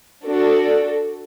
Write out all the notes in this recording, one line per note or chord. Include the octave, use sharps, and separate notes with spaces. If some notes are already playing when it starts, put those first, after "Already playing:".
D4 F#4 A4 D5